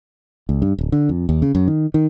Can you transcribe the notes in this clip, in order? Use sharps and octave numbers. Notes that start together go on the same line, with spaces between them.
C#2
G2
D1
D3
F2
D#2
C#3
F#2
D#3
D#3